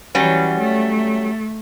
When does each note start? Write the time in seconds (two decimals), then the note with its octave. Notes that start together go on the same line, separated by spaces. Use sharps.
0.15 E3 F#3 G3 C#4
0.59 A3